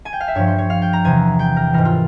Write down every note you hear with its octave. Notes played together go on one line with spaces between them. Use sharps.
G#5
G5
F5
E5
G2 F3 C#5
C5
C#5
F5
G5
A#5
E2 C3 E3 G#5
G5
A#4
G#2 E3 A#4
F4